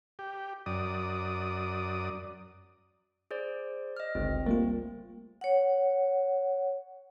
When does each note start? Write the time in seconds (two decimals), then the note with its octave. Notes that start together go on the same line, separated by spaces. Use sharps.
0.19 G4
0.66 F#2 D5 D#6
3.31 G#4 C5 D5
3.97 D#5 F6
4.15 G1 C#2 C4
4.46 G3 A3 A#3 C4 F4
5.41 C#5 F#5